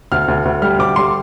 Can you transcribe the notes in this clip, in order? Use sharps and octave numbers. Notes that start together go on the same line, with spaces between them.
D2 F6
D2
D2
G3 F6
D2 D6
G3 C6